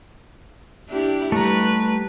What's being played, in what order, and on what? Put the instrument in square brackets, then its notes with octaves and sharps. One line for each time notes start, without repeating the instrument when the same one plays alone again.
[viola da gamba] D4 E4 G4
[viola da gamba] G3 B4 [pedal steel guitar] A3 A#5